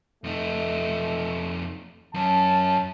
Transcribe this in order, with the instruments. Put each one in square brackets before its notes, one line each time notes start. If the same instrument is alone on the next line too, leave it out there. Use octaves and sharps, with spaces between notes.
[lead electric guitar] F2 D#4 [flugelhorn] A3
[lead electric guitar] F#2 C#4 [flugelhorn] A5